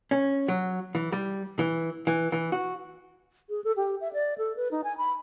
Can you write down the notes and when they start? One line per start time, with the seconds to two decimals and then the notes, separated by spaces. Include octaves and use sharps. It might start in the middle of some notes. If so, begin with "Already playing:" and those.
0.11 C#4
0.48 F#3
0.95 E3
1.12 G3
1.59 E3
2.07 E3
2.32 E3
2.52 F#4
3.50 G#4
3.64 A4
3.76 G4
4.01 E5
4.13 D5
4.38 A4
4.57 B4
4.71 D#4
4.84 G#5
4.98 B5